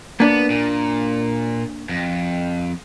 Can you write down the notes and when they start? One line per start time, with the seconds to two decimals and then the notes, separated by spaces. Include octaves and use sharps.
0.20 A#3 B3 D4 D5
0.50 A#2
1.89 F2